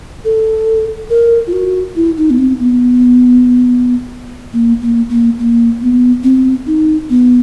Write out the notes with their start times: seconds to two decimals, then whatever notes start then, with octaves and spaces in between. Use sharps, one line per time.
0.25 A4
1.10 A#4
1.47 F4
1.53 F#4
1.96 E4
2.17 D#4
2.30 B3
2.38 C4
2.59 B3
4.53 A#3
4.82 A#3
5.09 A#3
5.39 A#3
5.82 B3
6.23 C4
6.67 D#4
7.10 B3